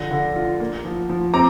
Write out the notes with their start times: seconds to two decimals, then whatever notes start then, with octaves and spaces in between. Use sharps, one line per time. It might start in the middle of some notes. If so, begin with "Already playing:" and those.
Already playing: D3 F3 A#6
0.11 D3
0.36 F4
0.60 A#3
0.85 F3
1.10 F3
1.34 C4 A#5 D6